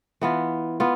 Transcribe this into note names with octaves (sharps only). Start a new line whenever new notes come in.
E3 B3 F4
B3 F4